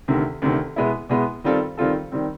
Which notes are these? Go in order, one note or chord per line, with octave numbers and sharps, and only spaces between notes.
D2 C3 D#3
D2 C3 D#3
B2 G#3 B3 E4
B2 G#3 B3 E4
D#3 G3 C4 F4 A4
D#3 G3 C4 F4 A4
D#3 G3 C4